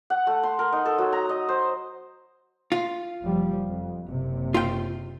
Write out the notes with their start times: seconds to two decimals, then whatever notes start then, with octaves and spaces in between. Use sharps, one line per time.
0.10 F#5
0.27 A3
0.43 C6
0.59 A#4
0.73 D#4
0.86 A4
0.98 F#3
1.12 A#5
1.29 D#5
1.49 C5
2.72 F4
3.22 F#1 F3 G3
3.66 F2
4.07 F#1 C3
4.54 F4 G5